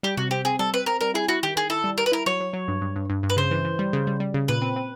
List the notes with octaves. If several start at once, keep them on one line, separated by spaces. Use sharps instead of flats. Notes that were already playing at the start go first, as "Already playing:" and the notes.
G3 G4
C3 F#4
C4 G4
C4 G#4
G3 A4
C4 B4
C4 A#4
G3 A#4
E4 G#4
E4 F#4
D#3 G4
D#3 G#4
E4 A4
G3
G3 A#4
B4
E4 A#4
F#3 C#5
F#3
F#3
G2
G2
G2
G2
G2
B4
C#3 C5
E3
E3
G3
C#3
G3
G3
C#3
A#2 B4
C4
C4